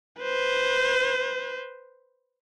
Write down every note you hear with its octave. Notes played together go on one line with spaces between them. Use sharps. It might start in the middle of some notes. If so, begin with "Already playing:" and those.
B4 C5